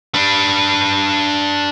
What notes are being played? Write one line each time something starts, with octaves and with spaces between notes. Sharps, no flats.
D4 B4